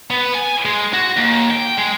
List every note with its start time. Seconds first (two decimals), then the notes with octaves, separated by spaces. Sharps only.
0.10 B3
0.35 G#5
0.65 G#3
0.94 F#4
1.17 D#2
1.51 G5
1.78 G#3